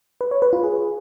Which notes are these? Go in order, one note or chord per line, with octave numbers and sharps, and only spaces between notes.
B4
C#5
B4
F4
G#4